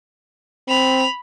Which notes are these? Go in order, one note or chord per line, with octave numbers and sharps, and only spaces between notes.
C4 B5 F7